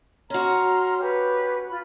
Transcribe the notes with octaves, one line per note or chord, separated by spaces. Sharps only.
C#4 F#4 A#5 C6 F6
G4 B4 C#5
F4 B5